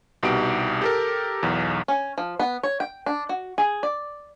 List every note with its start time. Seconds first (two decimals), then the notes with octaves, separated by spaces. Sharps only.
0.23 C2 B2 D#4 G4 D7
0.82 G4 A4 A#4
1.43 B1 E2
1.88 C#4
2.18 F3
2.39 B3
2.63 C#5
2.80 G5
3.06 D4
3.29 F#4
3.58 G#4
3.83 D5